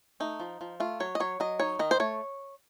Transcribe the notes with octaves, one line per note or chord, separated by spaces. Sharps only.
A3 D#4
F3
F3
A3 F4
F#3 C#5
D#5
F#3 C#5
F#3 D#5
D#4 C#5
D#3 D#5
C5
A3 C#5